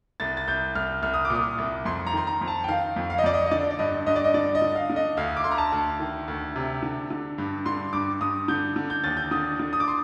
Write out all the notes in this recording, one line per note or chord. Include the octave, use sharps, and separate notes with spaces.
C2 A6
A6
C2 G6
C2 F6
C2 F6
D#6
D6
A#2
D#6
C2
F2 C6
A#5
D#3 C6
A#5
F2
A5
G5
D#3 F5
F2
F5
D#5
F2 D5
D#5
D#5
D3 D5
D5
G2 D#5
G2 D#5
D5
D#5
D3 D5
D#5
D3
F5
D3
D#5
D2 F5
D6
D2 C6
A#5
A5
D2
D#3
D2
C3
D3
D3
G2
D3 C6
G2 D6
G2 D#6
D3 G6
D3
G6
D#2 A6
G6
D3 D#6
D3
D#6
D6
C6